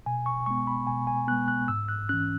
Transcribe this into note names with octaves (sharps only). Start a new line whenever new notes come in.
B2 G#5
C#6
G#3 B3 C#6
B5
B2 G#5
G#5
G#3 B3 F#6
F#6
G#2 E6
F#6
E3 C#4 F#6